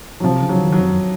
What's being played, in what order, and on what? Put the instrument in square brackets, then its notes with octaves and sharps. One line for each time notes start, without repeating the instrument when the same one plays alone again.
[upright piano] F#3
[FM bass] C3 [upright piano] F3
[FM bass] C#3
[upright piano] F#3
[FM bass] D#3
[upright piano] F#3
[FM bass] F2
F#2